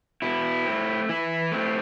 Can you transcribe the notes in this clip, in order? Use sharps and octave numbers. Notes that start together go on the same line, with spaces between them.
B2 E4
A3 C4
E3 E4
A3 C4